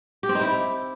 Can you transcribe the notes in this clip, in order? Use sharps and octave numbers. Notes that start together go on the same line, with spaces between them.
G4
C4
D#4
E4